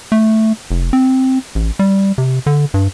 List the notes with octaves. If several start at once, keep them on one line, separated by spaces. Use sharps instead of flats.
A3
F1
C4
A1
G3
C3
D3
G2